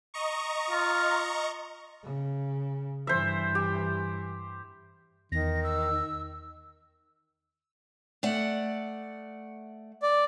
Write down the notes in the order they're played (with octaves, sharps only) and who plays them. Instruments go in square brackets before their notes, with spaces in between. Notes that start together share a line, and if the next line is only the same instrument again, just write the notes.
[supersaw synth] D#5 A#5 C#6
[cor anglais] F4
[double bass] C#3
[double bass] G2 E3 [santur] C5 E5
[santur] G4
[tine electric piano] E2 [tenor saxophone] D#3 [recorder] A#6
[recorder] E6
[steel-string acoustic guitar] A3 D5 F#5
[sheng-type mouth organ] D5